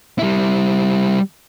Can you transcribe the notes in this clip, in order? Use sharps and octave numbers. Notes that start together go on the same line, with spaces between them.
G3 E4